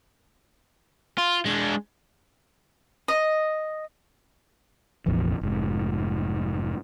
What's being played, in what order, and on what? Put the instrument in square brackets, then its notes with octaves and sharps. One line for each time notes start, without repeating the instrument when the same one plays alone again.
[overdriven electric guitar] F4
G#3 D4
[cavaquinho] D#5
[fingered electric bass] F1 A#1 F2 E3
F1 G#2